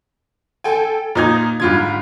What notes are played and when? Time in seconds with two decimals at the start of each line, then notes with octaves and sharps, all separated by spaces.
0.64 A4 G5 G#5
1.15 A#2 D#4 A#5 D#6 G#6
1.60 G#2 D3 G3 F4 G#6